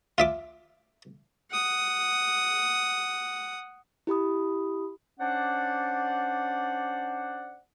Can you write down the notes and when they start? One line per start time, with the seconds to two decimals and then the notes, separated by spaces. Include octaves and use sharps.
0.18 F4 E5 D6
1.51 F#5 D#6
4.07 E4 G4 B5 D#6
5.20 C#4 D4 C5 D5 F#5